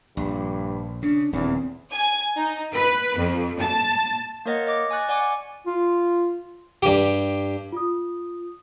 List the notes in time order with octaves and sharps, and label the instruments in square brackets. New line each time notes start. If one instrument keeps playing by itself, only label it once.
[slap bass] A#1 [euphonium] G2
[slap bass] C#3 [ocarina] D4
[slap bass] D#1 C#3 [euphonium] E2 [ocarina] C4
[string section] G#5
D#4
B4
F2
A5
[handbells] A#3 A#4 C#5 D#5 F#5 A6
D#5 D6
G#5 C#6 F#6 A6
D5 F#5 G#5 D6
F#5
[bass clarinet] F4
[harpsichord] G2 G4
[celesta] F4 D#6